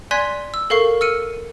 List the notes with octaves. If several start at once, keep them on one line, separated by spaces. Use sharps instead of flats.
D5 G#5 C6 F#6 G#6 B6
E6
A4 A#4 F5 C#6 C7
E6 F6 C#7 D#7